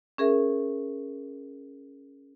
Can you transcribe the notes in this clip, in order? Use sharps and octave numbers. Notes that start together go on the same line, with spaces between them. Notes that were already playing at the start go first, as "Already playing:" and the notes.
C#4 G#4 A#4 E5